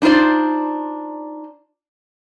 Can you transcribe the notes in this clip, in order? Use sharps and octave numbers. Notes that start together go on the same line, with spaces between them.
D4 D#4 F4 C5 D5